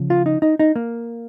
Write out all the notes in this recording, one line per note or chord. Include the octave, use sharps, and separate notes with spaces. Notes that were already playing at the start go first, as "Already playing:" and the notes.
Already playing: C#3 F3
F4
D#4
D#4
D#4
A#3